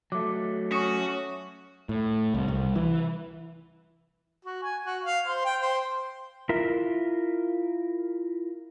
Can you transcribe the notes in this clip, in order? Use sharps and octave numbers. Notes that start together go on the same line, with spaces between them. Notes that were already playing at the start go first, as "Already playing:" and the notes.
F#3 A3 D6
C#4 F#4 C#6 D#6
A2
C2
C2
E3
F#4
G#5
F#4
F5
C5
G5
C5
E4 F4 A#4 E5